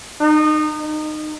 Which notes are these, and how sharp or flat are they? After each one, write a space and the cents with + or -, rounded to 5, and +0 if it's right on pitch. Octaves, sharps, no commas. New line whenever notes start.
D#4 -25
D#4 -25